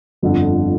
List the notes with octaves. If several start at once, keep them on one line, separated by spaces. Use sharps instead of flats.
G1 F2 D3